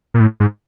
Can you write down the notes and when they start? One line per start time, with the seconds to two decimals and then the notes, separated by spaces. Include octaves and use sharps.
0.14 A#2
0.20 A2
0.40 G#2